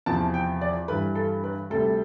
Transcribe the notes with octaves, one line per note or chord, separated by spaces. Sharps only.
E2 C3 F3 A5
G5
D5
G2 E3 G3 B4
A4
B4
D2 C3 G3 A4